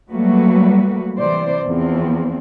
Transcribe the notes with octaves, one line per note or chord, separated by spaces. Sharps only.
F#3 G3 A3 A#3 F#4 B4
C3 E3 C5 D5
E2 F3 C4